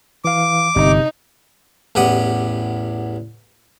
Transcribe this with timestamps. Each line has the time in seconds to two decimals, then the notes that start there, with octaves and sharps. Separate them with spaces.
0.25 E3 F5 D6
0.76 G1 C3 D#4
1.95 A1 E2 G4 F#5 D#6